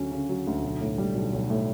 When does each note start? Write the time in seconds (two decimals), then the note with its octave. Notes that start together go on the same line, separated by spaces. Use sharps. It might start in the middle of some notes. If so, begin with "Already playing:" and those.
Already playing: D2 C#3 F#3 C#4
0.12 C#3
0.29 F#3
0.47 D2
0.63 B1
0.81 A2
0.98 G3
1.15 B1
1.33 B1
1.50 A2